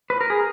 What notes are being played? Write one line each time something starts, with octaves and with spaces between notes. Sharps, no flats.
B4
A#4
G#4